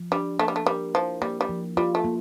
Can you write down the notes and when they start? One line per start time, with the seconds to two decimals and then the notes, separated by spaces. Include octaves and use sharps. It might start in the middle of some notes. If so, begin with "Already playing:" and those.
Already playing: F3
0.12 G3 D4
0.39 A3 A#3
0.48 G3
0.56 A3
0.66 G3 A#4
0.95 F3 E4
1.22 G3 A#3
1.41 G3
1.49 F3
1.77 G3 F4
1.95 A3
2.04 A#3